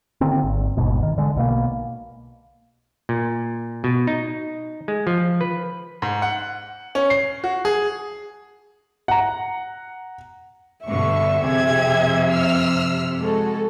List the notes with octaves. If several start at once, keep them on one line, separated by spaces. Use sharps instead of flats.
D3 D#3 A#3 C4
G#1
D#1 G#1 G#2 B2
D#3
D3 G#3
B1 B2 A#3
A#2
B2
D#4
G#3
F3
B4
G#2
F#5
C#4
C7
F#4
G#4
F#5 A#5
G2 B2 D3 E5 C#6
F2 C3 G4 G#4 G#6
E6 F6
G#3 F#4 A4